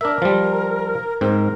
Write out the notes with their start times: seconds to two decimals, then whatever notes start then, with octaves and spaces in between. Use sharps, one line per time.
0.01 D4 A#4 E5
0.22 F3 G3
1.21 G#2 C4 A#4